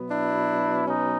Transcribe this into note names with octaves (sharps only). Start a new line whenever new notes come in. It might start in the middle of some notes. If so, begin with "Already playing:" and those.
Already playing: B2 F#3 B3
D4 E4
C#4 D#4